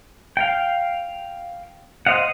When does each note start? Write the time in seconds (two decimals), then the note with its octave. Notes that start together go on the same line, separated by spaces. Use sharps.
0.37 F5 G5
2.06 C5 D#5 F5 F#5